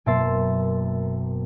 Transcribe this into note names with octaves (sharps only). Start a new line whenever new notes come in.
F#1 B2 A#3 E5 C6 A6